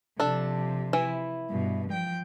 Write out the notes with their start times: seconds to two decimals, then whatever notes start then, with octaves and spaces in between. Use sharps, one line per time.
0.20 C3 F3 D4 A4
0.93 E3 E4
1.50 G2 B2
1.90 F3 G5